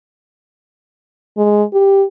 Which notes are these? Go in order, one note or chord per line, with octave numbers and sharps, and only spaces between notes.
G#3
G4